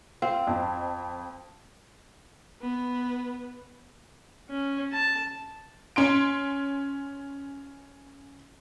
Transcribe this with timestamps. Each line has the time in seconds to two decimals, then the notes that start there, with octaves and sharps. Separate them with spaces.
0.22 C4 F4
0.47 F2
2.62 B3
4.50 C#4
4.92 A5
5.96 C#4 C6 D7